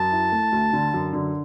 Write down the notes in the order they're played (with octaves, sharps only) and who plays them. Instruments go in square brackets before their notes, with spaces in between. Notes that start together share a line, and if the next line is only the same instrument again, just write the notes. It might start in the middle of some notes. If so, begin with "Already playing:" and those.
Already playing: [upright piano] F#2 [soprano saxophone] A5
[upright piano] E4
A3
D2
D3
F#2
D3